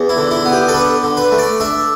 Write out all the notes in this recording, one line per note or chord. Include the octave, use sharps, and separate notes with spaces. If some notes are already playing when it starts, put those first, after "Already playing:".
Already playing: E2
E4
D3
E4
B3
G4
A4
D4 B4
D3
B4
A3
D5
D4 E5